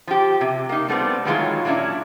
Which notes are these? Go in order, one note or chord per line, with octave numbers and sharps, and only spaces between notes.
F3 G4
C3
A#3 D#4
G3 A3 B3 C4
D#3 E3 F#3 G#3 F4 C#5
A#2 F#3 C#4 D4 E4